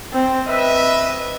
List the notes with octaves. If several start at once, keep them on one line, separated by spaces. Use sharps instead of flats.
C4
B4 D#5 E5